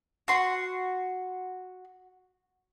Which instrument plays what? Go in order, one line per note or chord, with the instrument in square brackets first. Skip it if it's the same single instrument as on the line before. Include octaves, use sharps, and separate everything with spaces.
[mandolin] F#4 C6